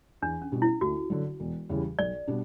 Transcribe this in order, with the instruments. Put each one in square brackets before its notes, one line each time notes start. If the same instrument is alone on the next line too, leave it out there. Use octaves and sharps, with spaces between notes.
[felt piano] E2 [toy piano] D4
[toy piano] C#4
[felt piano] B2 G3 D4 F#4
[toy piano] E4
[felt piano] D2 [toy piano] F#4
[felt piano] D3 F#3
E1
E2 C#3 E3 G3
[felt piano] B1 [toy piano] D5
[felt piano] B2 G3 D4 G4